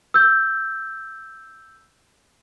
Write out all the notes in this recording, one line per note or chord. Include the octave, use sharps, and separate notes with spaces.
E6 G6